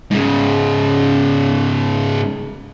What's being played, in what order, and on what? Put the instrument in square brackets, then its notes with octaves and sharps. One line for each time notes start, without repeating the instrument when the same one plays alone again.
[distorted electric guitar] G#2 C#3